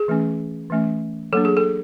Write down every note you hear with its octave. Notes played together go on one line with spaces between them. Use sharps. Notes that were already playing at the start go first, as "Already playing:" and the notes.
Already playing: G#4
E3 A3 C#4
E3 A3 C#4
F#3 A#3 D4 A4
G#4
A4